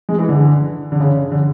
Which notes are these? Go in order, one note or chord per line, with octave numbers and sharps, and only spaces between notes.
G#3
E3
D3
D3
C#3
D3